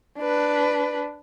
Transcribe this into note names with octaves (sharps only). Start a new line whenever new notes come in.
D4 B4